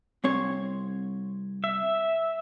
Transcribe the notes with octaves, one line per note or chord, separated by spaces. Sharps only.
C2 C4 C#5
E5